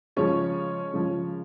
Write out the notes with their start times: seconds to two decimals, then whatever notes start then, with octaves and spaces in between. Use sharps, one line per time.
0.16 C#3 F3 G#3 C#4 C#5
0.93 C#3 F3 G#3